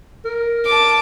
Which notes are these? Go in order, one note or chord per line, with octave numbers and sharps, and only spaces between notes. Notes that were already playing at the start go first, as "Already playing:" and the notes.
A#4
A5 D6